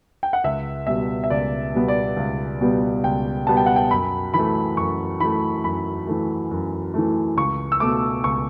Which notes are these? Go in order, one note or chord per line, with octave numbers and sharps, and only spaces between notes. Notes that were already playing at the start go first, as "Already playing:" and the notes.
G5
F#5
C#2 E5
B2 G3 B3 E5
E5
C#2 D5
B2 G3 B3
D5
C#2
B2 G3 B3
C#2 G5
B2 G3 B3 A5
G5
F#5
G5
F#2 B5
E3 A3 B5
F#2 C#6
E3 A3 B5
F#2 B5
E3 A3
F#2
E3 A3
C#2 C#6
E6
B2 A3 D6
C#2 C#6